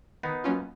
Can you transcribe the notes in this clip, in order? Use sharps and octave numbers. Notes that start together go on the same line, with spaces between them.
D#3 B3 D#4
F#3 A#3 C#4 F4